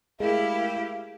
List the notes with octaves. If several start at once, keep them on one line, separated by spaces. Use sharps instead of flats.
G#3 A3 E4 G4 A#4 F5 G5